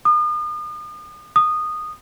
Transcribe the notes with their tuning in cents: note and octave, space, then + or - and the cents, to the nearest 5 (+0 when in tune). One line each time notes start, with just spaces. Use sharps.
D#6 -40
D#6 -15